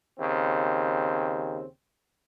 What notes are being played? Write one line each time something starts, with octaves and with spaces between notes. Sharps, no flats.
D#2 C#3 C4